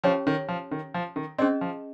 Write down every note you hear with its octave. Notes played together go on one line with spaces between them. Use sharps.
F3 C#4 G4 C#5 G5
D#3
F3
D#3
F3
D#3
C4 C#4 G#4 D#5
F3